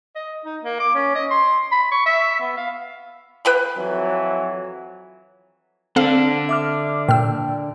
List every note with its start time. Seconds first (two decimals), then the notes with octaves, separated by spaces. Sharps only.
0.16 D#5
0.46 D#4
0.63 A#3
0.80 D6
0.95 C#4
1.15 D#5
1.31 C6
1.72 B5
1.92 C#6
2.06 E5
2.40 B3
2.57 F5
3.45 B4 G5 B5
3.77 F2 E3 F#3
5.96 D3 C4 D4 A4 F5
6.49 E5 D6 F6
7.09 A#2 G5 E6